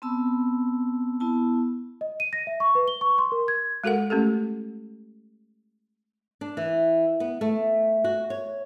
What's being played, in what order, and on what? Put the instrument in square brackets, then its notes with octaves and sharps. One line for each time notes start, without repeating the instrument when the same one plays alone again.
[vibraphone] B3 C4 A5 B5 E6
B3 E4 A5
[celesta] D#5
D#7
A#6
E5
C#6
B4
G7
C#6
C6
A#4
G#6
[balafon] G#3 F#4 A4 A#4 F#5
A3 C#4 G4 A4
[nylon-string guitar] D4
E3
B3
A3
F#4
C#5